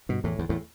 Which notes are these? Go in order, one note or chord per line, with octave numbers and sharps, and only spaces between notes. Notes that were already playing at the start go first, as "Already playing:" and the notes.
G2 B2
E2 A2
E2
E2 A2